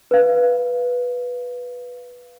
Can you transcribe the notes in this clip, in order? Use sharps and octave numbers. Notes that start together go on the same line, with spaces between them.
B4 F5